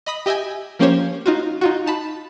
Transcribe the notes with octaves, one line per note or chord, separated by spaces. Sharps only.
D#5 B5 D#6 B6
G4 D#5 E5 G5 G#5
F3 A#3 C#4 G4 C5 C#5
D#4 F4 F#4
D#4 F4 F#4
D#4 A5 B5